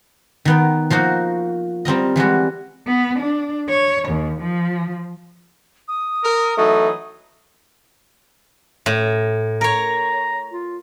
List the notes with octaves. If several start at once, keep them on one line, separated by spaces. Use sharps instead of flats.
D#3 B3 G5
F3 A#3 D#4 F#4
G3 C4 A#4 D#5
E3 G3 G#3 F#4
B3
D4
C#5
D#2
F3
D#6
A#4
E3 F#3 A3 D#4
A2
A#4 C#5 A#5
F4